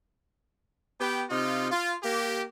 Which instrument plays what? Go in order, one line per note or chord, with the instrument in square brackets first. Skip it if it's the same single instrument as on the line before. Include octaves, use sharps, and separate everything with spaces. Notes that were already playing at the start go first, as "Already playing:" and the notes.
[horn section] B3 G4 B4 G5
C3 D#4 F4
F4
A#3 G4